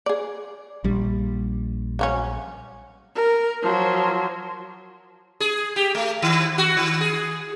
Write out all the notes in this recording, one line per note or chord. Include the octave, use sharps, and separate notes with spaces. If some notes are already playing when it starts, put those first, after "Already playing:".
G#4 D5
A#1 G3
C#3 F#3 C#4
A#4
F3 F#3
G#4
G4
A3
D#3
F#4
D#3
G#4